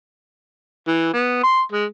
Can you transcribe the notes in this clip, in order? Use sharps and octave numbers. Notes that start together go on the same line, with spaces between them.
E3
B3
C6
G#3